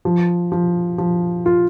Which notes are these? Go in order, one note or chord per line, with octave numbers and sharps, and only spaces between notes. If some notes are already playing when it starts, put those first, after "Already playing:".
F3
F3
F3
F4